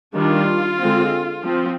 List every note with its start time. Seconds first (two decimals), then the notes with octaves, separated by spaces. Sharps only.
0.16 D#3 G3 D4 F4
0.80 D3 G#3 C4
1.46 F3 C4